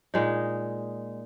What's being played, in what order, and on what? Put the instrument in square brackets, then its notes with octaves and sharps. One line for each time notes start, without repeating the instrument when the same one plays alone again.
[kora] A#2 G#3 D#4